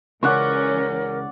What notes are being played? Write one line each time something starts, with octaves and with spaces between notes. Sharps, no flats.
C#2 C#3 E3 C#4 A#4 D5 F#5 C#6